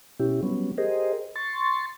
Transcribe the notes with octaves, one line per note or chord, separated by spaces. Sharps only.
B2 C#4 E4 G4
F#3 G3 B3 C#4
G4 G#4 A#4 C5 D#5
C6 C#6 A6